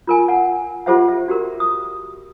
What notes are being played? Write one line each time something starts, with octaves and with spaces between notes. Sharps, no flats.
F4 A#4 G#5
F#5 G#5
F4 G4 A4 C5 E5 F#5
E5
F#4 G4 A#4
D#6